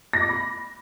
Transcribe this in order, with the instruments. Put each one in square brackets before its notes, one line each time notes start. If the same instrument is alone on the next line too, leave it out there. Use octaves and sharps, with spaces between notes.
[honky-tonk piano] A#6
D6
B5